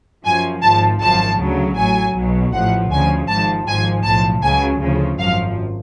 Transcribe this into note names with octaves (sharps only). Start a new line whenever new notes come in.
F#2 F3 G#5
G#1 G#2 F3 A5
G#1 F#2 F3 A5
D2 C#3 F#3
A1 A2 F#3 G#5
B1 B2 F#3
A1 A2 F3 F#5
D2 C#3 F3 G#5
G#1 G#2 F3 A5
G#1 G#2 F3 G#5
B1 A2 F3 A5
C#2 C#3 F#3 G#5
D2 C#3 F3
G#1 F#2 F3 F5